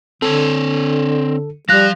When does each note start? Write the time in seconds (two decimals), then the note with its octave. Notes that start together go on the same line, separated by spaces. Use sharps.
0.22 D3 C4 A4 C#5
1.69 F3 G3 F5 F#6 A#6